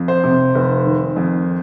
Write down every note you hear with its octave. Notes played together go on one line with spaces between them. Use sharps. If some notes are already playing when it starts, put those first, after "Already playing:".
Already playing: F2
C5
C3
F1
D#3
F2